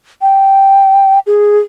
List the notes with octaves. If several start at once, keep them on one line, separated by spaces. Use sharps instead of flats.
G5
G#4